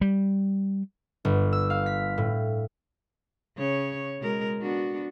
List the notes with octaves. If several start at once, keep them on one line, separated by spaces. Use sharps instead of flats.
G3
G1
E6
F5
B6
A2
C#3 C#5
B2 G#3 A#4
B3 D4 F#4